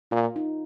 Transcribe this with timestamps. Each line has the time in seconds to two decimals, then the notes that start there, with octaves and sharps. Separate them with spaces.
0.11 A#2 F4
0.36 D#4